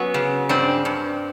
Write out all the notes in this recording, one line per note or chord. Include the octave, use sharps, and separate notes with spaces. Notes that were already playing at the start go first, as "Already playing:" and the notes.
Already playing: F#3 B3 C#4
C#3
G2 C4 D4
G2